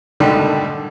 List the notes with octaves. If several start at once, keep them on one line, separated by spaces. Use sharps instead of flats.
G#2 B2 D3 D#3 G3 A3